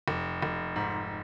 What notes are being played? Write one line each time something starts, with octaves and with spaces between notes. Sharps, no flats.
F1
F1
G#2